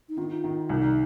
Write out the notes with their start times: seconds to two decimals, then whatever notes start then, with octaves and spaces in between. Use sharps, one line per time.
0.09 D#4
0.18 D#3 F4
0.44 D#3
0.70 C2 D#4